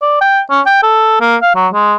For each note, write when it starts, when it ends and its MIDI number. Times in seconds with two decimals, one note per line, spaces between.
0.02 0.18 74
0.21 0.41 79
0.50 0.61 61
0.66 0.80 79
0.83 1.16 69
1.21 1.36 58
1.42 1.55 77
1.55 1.68 54
1.74 1.96 56